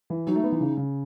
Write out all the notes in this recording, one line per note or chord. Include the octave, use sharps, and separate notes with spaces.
E3
F#3 D#4
A3
B3
E3
C#3
C#3